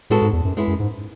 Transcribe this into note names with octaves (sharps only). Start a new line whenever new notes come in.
A2 G#3 B3 F#4 A4
G#2
E2
F#2
G#3 B3 E4 G#4
F#2
G#2